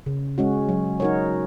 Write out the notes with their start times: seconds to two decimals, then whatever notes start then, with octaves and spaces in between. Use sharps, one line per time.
0.06 C#3
0.38 G#3 C#4 F#4
0.69 F#3
1.00 D#4 F#4 A#4 C#5